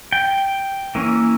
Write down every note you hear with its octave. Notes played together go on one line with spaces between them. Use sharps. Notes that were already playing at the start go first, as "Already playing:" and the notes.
G5
E3 A#3 C#4